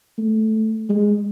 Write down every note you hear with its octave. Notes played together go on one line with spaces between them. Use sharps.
A3
G#3